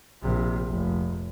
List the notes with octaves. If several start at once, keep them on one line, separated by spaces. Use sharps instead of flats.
A#1 C3
F1